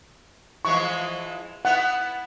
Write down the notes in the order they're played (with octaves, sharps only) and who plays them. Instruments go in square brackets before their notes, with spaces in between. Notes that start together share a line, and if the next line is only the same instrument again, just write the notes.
[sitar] E3 F3 G#3 [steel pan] C#6
[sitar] B3 E4 [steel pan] F#5